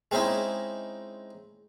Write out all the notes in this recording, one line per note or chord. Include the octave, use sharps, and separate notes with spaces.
G#3 C4 C#4 D#4 E4